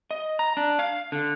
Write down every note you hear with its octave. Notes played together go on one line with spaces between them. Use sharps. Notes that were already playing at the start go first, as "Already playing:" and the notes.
D#5
A#5
D4
F5
D3